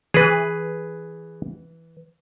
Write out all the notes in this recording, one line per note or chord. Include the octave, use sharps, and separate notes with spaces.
E3 G#4 B4